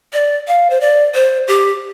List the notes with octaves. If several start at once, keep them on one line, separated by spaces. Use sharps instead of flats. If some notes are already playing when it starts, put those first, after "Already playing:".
D5
F5
C5
D5
C5
G4